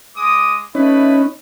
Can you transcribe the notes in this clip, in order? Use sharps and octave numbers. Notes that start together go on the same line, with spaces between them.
G#3 D6 D#6
A3 C#4 D#4 E4 B4